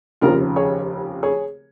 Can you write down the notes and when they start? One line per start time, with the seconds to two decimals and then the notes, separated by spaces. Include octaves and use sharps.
0.21 F1 D#2 C#3 F3 F4 A#4
0.56 G#4 C#5
1.23 G#4 C#5